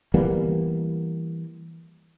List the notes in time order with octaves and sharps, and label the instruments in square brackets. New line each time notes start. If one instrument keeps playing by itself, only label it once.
[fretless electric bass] E3 G3 A#3 B3